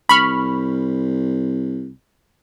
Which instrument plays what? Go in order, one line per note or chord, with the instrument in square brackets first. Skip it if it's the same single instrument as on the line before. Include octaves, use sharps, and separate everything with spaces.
[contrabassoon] C2 [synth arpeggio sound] B5 C#6 F6